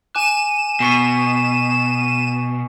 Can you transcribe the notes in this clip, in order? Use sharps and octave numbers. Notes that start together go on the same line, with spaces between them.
G#5 D6 F#6 D#7 E7
B2 G#5 C#6 B6